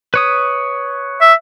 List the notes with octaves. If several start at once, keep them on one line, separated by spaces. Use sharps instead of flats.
B4 C#5 D#6
E5